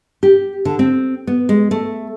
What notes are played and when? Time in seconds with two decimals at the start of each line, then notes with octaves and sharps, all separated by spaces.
0.23 G4
0.65 D3
0.79 C4
1.27 B3
1.49 G#3
1.71 A3